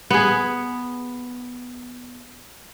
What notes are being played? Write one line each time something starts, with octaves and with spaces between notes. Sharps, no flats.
B3 G#4